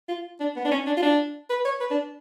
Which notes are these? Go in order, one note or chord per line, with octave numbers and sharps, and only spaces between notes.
F4
D4
B3
D4
C#4
D4
F4
D4
B4
C#5
B4
D4